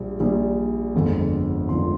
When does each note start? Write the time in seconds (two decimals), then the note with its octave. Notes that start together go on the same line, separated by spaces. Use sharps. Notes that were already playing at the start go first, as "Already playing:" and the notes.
Already playing: A#1 A#2 G3
0.20 A#1 A#2 G3
0.95 G1 F2 D3 F3 G#3
1.69 G1 F2 D3 F3 G#3 C6